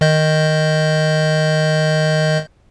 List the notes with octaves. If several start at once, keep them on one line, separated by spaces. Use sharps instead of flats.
D#3 D#5 G6